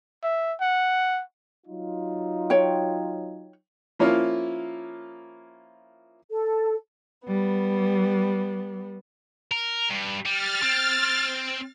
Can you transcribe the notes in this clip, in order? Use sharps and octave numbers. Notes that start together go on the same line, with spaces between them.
E5
F#5
F#3 D#4 F4
C#5 G5
F3 A#3 C#4 E4 F4
A4
G3 B3
A#4
G2
G3 F6 A6
C4